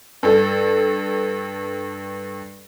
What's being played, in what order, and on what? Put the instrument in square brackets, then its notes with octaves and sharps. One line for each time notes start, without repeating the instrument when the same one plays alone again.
[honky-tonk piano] G2 A4